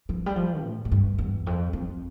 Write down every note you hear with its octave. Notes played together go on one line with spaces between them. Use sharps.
F3
G3
F3
A2
A2
G2
E2
F2
F2